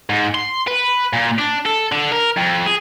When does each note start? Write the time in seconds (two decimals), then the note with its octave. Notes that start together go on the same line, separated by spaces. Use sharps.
0.10 G#2
0.35 C6
0.67 B4
1.13 A#2
1.39 D4
1.66 A4
1.92 D3
2.12 A#4
2.37 F2
2.66 G#4